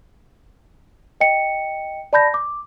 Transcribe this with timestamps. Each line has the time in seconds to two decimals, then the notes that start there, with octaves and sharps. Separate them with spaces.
1.21 D#5 G5 C#7
2.13 D5 A5 B5 G6 A#6
2.34 D6